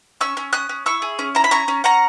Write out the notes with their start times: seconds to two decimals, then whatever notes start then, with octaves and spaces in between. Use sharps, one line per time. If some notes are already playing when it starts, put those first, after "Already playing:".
0.21 C#4 C#6 E6
0.37 C#4
0.53 C#4 D#6 F#6
0.69 C#4
0.86 E4 C#6 E6
1.02 G#4
1.19 C#4
1.35 E4 A#5
1.44 B5
1.51 C#4 A#5 C#6
1.68 C#4
1.84 C#4 F#5 A#5